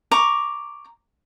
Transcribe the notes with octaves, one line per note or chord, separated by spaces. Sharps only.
A#5 C#6 D6